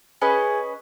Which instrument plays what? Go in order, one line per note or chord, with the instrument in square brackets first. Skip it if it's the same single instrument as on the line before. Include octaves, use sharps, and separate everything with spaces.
[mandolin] C#4 B4 D#5 [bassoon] G#4